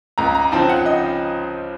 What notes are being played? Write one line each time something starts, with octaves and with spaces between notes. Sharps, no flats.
C#2 A#5
A#5
C#3 F3 C4 D#4 A5
F#5
D#5